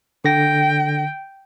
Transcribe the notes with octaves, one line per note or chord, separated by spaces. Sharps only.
D3 G5 A#6